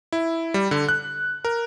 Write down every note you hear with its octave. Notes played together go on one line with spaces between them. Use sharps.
E4
G3
D3
F#6
A#4